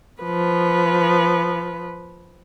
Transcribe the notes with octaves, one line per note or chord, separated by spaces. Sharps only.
F3 B4